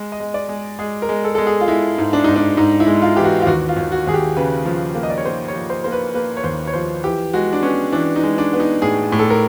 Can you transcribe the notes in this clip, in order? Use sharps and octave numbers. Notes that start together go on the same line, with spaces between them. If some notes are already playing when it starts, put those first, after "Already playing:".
Already playing: G#3
D#5
G#3
D5
G#3
G#3 G#4
A#4
G#3
A4
G#3 A4
G#4
F4
G#3 E4
G#2
D4
G#2 D#4
D4
G#2 D#4
E4
G#3
F4
E3 G4
F#4
F4
D#2 F#4
F4
D#2
F#4
D#2 G#4
G4
C#3 B4
F3
A#3
D#5
D5
C#5
A#3 C5
C#5
F3
C5
A#3 C5
B4
A#3 B4
C#5
D#2 C5
C#5
F3 C5
E3 G4
G#3 F#4
D4
B3 C#4
E3 D4
D#4
G#3
D4
B3
D#4
A2 G#4
A2
A4
A#4